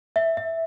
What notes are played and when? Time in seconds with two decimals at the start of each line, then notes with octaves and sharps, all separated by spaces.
0.16 E5
0.37 E5